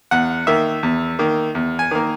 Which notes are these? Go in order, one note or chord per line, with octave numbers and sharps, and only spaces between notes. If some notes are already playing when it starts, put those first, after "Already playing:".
E2 F#5
D#3 A#3 E5
E2
D#3 A#3
E2
G#5
D#3 A#3